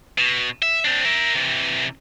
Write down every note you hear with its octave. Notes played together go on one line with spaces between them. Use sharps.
B2
E5
C4 D4
A#4 E5
C3 E3